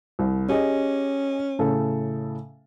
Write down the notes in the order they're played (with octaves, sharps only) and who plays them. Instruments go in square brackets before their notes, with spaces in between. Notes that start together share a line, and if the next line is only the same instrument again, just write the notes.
[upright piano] C2
[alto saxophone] C#4 [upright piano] G4 G#4 D#5
[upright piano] A2 C#3 A4